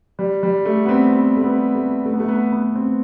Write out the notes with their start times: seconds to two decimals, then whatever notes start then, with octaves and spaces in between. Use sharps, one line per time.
0.19 G3
0.43 G3
0.65 A3
0.85 B3
0.89 C4
1.13 B3
1.37 A3
1.44 B3
1.75 A3
2.06 A3
2.13 B3
2.20 A3
2.28 B3
2.52 B3
2.76 C4